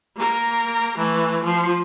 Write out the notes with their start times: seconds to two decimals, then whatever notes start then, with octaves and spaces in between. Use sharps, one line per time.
0.16 A#3 A#4
0.98 E3 A3
1.44 F3